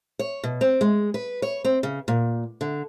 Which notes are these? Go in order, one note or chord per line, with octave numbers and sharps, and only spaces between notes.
C#5
B2
C4
G#3
B4
C#5
C4
C#3
A#2
D3